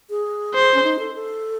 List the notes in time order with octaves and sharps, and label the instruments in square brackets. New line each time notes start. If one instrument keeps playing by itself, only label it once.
[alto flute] G#4
[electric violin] C5
[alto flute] C#4
D#4
A4
A4